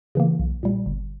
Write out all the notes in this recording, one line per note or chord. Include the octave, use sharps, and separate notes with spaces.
C#3 E3 A#3
B1
A#2 G3
G1